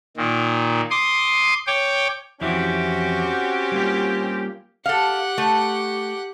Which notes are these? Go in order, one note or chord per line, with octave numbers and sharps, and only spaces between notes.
A#2 D#3
C6 D6 D#6
C#5 G5 D6
F2 E3 C4 C#4 E4 F#4 G4
G3 A#3 F4
G4 A4 F5 F#5
A3